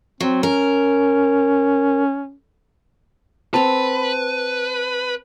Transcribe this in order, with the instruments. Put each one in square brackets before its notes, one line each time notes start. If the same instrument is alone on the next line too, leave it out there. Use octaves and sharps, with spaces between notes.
[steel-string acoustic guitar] F#3 [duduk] C4
[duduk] C#4 [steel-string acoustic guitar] A#4
[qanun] C4 A4 A#5 [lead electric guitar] B4 [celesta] A5